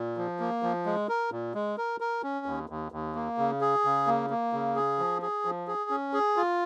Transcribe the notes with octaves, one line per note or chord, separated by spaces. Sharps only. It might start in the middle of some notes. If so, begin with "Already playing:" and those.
Already playing: A#2
F3
A#3
F3
G#3
A#4
A#2
G#3
A#4
A#4
C#4
D#2
D#2
D#2
A#3
C#3
G#4
C#3
A#3
A#3
C#3
G#4
F3
G#4
F3
G#4
C#4
G#4
F4